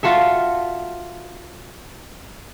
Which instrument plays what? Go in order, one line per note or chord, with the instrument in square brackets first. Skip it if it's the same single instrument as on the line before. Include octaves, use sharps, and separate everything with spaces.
[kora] F4 F#4 A4 E5